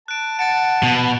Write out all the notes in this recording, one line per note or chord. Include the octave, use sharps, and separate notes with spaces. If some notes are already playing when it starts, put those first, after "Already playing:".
A5 F#6 D7
F#5 A5 A6 C#7 D7
B2